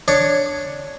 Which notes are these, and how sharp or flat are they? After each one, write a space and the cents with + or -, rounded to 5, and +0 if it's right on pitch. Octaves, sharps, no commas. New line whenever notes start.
D4 +0 C#5 +0